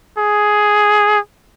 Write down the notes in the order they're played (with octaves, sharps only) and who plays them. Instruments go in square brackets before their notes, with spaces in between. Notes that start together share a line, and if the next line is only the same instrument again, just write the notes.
[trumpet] G#4